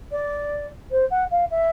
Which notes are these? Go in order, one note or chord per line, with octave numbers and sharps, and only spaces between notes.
D5
C5
F#5
F5
E5